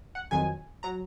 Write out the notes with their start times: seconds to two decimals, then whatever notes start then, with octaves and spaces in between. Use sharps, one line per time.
0.15 F#5
0.31 F2 D#3 F#3 G#5
0.83 F#3 A#5